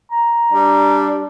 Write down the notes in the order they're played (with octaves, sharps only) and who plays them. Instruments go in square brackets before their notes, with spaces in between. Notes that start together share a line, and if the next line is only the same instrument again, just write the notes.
[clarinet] A#5
[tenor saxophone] G3 [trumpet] D4